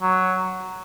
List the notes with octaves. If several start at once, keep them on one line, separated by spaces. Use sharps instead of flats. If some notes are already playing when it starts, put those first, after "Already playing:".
F#3